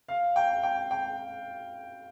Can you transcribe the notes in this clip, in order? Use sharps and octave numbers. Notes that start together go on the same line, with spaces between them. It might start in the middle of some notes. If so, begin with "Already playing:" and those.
F5
G5
G5
G5